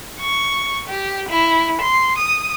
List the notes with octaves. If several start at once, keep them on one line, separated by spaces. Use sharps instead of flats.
C#6
G4
E4
C6
D#6